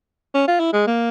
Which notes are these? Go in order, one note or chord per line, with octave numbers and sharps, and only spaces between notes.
C#4
F4
E4
G#3
A#3